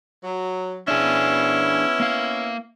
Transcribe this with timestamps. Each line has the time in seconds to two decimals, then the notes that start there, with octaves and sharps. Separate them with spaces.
0.24 F#3
0.88 B3 C#4 D4 E4 G#4
2.00 A#3 F5